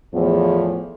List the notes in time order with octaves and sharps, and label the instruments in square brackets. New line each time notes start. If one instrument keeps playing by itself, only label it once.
[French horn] E2 [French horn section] A2 F3